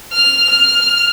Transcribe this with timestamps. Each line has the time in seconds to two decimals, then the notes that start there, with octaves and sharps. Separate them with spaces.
0.13 F6
0.49 F6